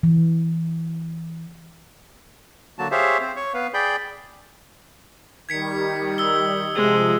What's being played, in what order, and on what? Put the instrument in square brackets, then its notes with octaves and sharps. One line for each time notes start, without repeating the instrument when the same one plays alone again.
[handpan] E3
[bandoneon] D3 F#3 A#3 F#4 A5
G4 G#4 C5 C#5 E5 F5
C4 C5
C#5 C#6
B3 B4 F5
G#4 D5 G5 B5 G6
[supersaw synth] D#3 G3 [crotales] G#6 B6 C#7
[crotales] D#6 E6 G7
[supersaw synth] C3 F3 [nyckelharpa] G#3